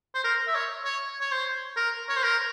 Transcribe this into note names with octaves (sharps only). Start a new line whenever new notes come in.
C5
A#4
E5
C#5
C#5
C#5
C5
A#4
C#5
C5
A#4